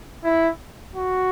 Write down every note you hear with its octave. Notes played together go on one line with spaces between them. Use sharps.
E4
F#4